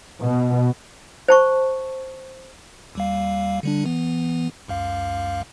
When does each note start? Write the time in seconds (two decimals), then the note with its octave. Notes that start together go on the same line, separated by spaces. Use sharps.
0.21 B2
1.28 C5 A5 C#6
2.95 D#2 G3 F5
3.63 D3 G3 D4
3.86 E3 B3
4.68 C#2 F#2 F5